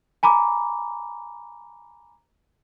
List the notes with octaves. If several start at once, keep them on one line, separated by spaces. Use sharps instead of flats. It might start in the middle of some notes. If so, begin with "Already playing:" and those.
G#5 A#5 B5 D6